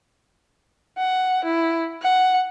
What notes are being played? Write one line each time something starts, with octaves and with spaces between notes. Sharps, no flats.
F#5
E4
F#5